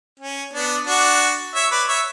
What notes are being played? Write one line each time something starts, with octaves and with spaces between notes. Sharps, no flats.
C#4
B3 D4
D4 F#4
C#5 E5
B4 D5
C#5 E5